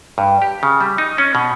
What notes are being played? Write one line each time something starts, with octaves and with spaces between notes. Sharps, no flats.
G2
G4
C#3
G3
D#4
C#4
B2